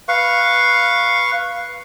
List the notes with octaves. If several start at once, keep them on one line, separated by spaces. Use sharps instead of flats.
B4 F5 C#6